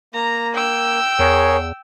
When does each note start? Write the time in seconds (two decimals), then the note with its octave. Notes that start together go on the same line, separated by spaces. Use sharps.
0.14 A#3 A#5
0.55 G5 E6
1.19 E2 G#4 A#4 C#5